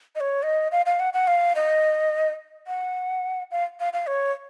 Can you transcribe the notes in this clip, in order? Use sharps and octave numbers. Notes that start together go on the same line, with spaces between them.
D#5
C#5
D#5
F5
F5
F#5
F#5
F5
D#5
F#5
F5
F5
F5
C#5